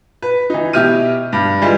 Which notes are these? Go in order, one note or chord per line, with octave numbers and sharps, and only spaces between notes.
B4
E3 D#4
B2 E4 G4 F6 D#7
G2
E3 G3 G#3 F4